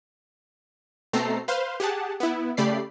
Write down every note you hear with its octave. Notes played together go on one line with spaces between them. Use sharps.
B2 A3 C4 A4 A#5 C7
B4 C5 F5 C6
G4 G#4 F#5 A5
B3 E4
C#3 A3 G4 D5 B5 C7